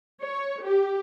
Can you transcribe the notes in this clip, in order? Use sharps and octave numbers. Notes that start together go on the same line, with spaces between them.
C#5
G4